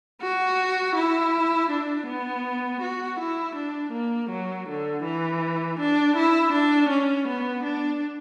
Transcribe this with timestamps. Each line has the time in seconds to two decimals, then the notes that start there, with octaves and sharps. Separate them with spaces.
0.21 F#4
0.95 E4
1.70 D4
2.07 B3
2.81 F#4
3.19 E4
3.55 D4
3.92 A#3
4.29 F#3
4.67 D3
5.03 E3
5.79 D4
6.16 E4
6.52 D4
6.89 C#4
7.27 B3
7.64 D4